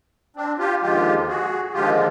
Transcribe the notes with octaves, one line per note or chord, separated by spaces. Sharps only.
C4 D4
F4 G4
D#2 D3 F3 G#3 F4 G4
F#4 G#4
D#2 D3 F3 G#3 F4 G4